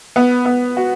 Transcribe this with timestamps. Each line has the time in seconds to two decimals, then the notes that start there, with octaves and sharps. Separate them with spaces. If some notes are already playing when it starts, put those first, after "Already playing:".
0.16 B3
0.45 B3
0.77 F#4